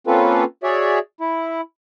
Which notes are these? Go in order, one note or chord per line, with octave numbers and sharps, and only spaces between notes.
A#3 C4 C#4 F4 A4 B4
F#4 G#4 C#5 D5 E5
E4